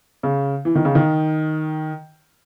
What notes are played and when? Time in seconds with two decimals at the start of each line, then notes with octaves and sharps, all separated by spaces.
0.23 C#3
0.65 E3
0.75 D#3
0.85 C#3
0.95 D#3